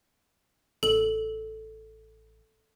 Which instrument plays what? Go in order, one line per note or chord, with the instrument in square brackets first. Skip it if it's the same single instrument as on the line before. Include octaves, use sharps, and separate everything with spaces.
[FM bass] A1 [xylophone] A4 F#7